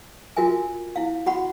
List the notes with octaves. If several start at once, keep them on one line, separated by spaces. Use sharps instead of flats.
F4 F#4 A#4 E5 G#5
E4 F5
F#4 F#5 B5 C#6